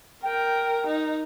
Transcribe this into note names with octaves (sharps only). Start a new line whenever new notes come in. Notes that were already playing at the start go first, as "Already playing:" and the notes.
A#4 G5
D#4